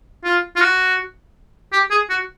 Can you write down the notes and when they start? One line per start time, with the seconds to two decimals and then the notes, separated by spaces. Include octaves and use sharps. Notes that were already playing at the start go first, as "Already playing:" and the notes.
0.24 F4
0.56 F4
0.61 F#4
1.72 G4
1.91 G#4
2.10 F#4